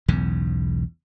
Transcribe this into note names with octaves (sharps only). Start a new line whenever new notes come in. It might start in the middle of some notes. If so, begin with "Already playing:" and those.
B1 E2 G#2 C#3